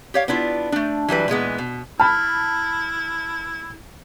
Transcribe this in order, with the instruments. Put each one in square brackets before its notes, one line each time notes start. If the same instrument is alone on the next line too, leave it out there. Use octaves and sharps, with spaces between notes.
[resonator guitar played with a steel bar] G4 C#5 F5
B3 D4 E4 F4
A3 D4
E3 F#3 G3 B4
A#2 E3 G#3 B3
B2
[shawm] E4 [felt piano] A5 B5 [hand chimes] F6